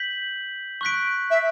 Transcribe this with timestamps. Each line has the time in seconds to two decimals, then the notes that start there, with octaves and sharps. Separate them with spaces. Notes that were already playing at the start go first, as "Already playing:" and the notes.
Already playing: G6 B6 F#7
0.81 C#6 F#6 B6 D7
1.31 E5